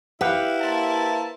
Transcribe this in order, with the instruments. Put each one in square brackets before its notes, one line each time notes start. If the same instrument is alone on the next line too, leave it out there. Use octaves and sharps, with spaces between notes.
[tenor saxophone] E4 [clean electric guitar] G4 F5 F#5 [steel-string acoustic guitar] B4
[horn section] A#3 C5 A5